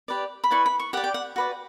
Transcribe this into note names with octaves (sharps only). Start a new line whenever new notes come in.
G4 B4 D5
B5
E4 B4 D5 C#6
B5
C#6
G4 D5 F#5
G5
F#5
F#4 B4 D5